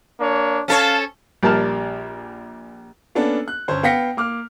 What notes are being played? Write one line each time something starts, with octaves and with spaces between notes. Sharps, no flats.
A#3 D4 C#5
C#4 A4 C#5 F5 A5
A#1 G3 A#4 A5 F6
A#3 B3 C#4 D4 A4
F#6
G1 C#4 C5 C#5
B3 F5 G5 A#6 B6 C#7
A#3 D6 F6